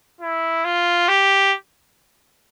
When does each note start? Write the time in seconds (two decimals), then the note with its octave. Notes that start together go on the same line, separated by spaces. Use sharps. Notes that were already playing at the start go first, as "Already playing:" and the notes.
0.21 E4
0.65 F4
1.08 G4